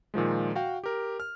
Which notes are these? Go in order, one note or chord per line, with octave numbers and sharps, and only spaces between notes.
A#2 D#3 F3 G#3
F#4 F5 G5
G4 A#4
F6